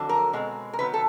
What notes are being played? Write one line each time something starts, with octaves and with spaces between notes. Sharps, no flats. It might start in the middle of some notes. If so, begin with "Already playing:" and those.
Already playing: F2 D3 F#3
A#4
B2 G#3 C4
A#4
C3 D#3 F#3 B3 B4
A4